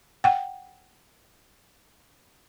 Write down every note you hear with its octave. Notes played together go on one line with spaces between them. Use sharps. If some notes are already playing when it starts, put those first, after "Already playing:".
F#5 G5